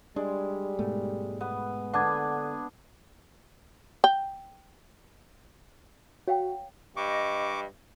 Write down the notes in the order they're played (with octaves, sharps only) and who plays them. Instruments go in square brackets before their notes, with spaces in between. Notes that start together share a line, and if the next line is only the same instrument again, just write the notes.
[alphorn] G3 [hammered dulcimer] G#3 [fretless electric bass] D4
[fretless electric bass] G#2 B2 A3
[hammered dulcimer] B3
[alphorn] D3 [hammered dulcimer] B3 D4 [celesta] F#5 D6 G#6
[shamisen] G5
[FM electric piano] F#4 [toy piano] C#5 F5 G5
[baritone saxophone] G2 [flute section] D#5 [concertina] C#6 D6